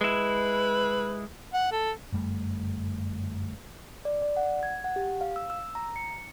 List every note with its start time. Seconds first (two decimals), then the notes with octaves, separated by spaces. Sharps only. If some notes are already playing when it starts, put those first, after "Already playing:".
0.01 G#3 E4 B4
1.54 F#5
1.72 A4
2.12 G1 F#2 G3 A3
4.05 D5
4.22 D5
4.37 F#5
4.63 G#6
4.84 F#5
4.96 G4
5.21 F5
5.36 E6
5.50 E6
5.75 A#5
5.96 C#7